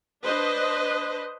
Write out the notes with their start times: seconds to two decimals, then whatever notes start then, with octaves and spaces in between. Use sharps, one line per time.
0.24 D4 B4 C5 D#5